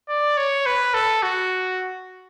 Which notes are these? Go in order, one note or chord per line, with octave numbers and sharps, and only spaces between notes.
D5
C#5
B4
A4
F#4